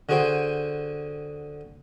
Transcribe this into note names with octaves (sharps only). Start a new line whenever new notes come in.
D3 F#4 G#4 C5 G5